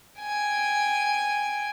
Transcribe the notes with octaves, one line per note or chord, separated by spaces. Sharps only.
G5 G#5